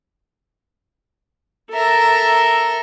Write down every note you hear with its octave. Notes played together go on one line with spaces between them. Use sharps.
A4 A#4 E5